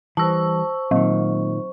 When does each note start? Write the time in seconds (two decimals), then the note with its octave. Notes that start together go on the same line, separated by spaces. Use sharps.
0.17 E3 G3 C5 A5 C#6 E6
0.91 A#2 D#3 F#3